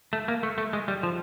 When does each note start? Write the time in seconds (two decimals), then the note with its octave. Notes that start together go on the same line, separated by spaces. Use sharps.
0.13 A3
0.28 A#3
0.43 A3
0.58 A3
0.73 G#3
0.88 G3
1.03 F3